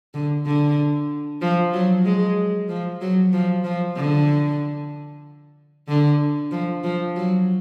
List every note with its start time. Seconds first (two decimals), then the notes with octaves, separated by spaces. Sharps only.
0.14 D3
0.46 D3
1.42 F3
1.74 F#3
2.05 G#3
2.69 F3
3.01 F#3
3.33 F3
3.64 F3
3.96 D3
5.88 D3
6.51 F3
6.84 F3
7.16 F#3